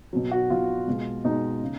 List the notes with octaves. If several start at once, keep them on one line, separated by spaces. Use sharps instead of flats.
B2 F#3
F#4
B2 F#3 F4
B2 G#3
B2 G#3 D#4
C#3